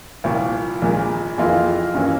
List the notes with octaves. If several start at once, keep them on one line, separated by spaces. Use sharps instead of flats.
C2 A#2 F3
A#1 A#2 G#3
F2 E3 A#3 F4 G#4
G2 E3 A#3 C#4